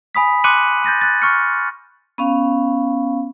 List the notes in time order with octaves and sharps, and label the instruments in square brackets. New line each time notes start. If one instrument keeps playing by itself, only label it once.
[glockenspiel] G#5 B5 D#6 B6
C6 D6 F#6 C#7 D#7 F#7
G6 A6 A#6 D#7
F#6 A6
C#6 F6 C#7
[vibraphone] B3 C#4 F5